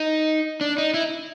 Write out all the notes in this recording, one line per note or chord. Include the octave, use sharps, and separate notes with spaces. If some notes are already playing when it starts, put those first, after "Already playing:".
Already playing: D#4
D4
D#4
E4